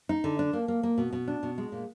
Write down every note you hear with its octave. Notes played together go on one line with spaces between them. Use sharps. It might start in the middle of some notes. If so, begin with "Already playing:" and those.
D#4
D3
D4
A#3
A#3
A#3
B2
B2
D4
B2
G#3
A#2